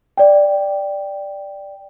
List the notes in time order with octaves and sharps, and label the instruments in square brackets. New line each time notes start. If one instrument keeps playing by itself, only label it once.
[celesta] D5 G5